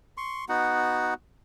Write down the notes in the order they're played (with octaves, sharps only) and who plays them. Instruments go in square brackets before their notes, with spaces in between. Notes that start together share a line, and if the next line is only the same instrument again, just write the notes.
[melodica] C6 C#6
B3 D#4 F#4 F#5